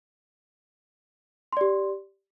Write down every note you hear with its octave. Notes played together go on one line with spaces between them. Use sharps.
G4 D5 C6